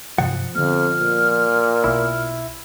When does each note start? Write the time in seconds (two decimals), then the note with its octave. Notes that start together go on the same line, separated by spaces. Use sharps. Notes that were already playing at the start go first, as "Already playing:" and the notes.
0.18 G2 C3 F3 F#5
0.55 F2 D3 B3 F6
1.01 A#2
1.84 B1 B3 E4